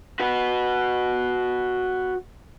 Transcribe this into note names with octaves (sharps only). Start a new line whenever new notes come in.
F#4 B4